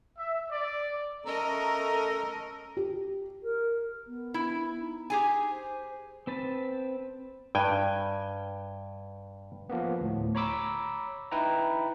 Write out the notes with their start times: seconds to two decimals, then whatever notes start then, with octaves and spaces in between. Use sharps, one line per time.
0.17 E5
0.50 D5
1.25 A3 C#4 A4 A#4 D#5 A#5
2.77 G4
3.43 A#4
4.07 B3
4.34 E4
4.79 D#4
5.10 G4 G#4 G#5
5.51 C5
6.27 C4 B4 A5
7.55 G2 G5 G#5
9.69 F3 A#3 B3
10.01 D2 A2
10.35 C#5 A#5 B5 D6 E6
11.31 D#4 E4 B4 G5 A#5